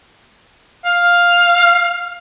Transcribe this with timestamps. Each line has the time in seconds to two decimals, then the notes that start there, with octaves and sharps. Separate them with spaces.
0.85 F5